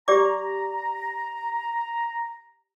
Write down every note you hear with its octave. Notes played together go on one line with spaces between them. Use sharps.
G4 D5 A#5 D6